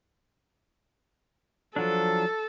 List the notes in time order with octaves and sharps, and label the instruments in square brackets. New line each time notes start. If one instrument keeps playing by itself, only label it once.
[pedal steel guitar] F3 F#3 D4 [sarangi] A4